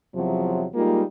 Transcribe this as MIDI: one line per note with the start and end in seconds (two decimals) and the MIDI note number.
0.15 0.65 40
0.15 0.65 48
0.15 0.65 53
0.15 0.65 54
0.75 1.03 55
0.75 1.03 56
0.75 1.03 58
0.75 1.03 63
0.75 1.03 65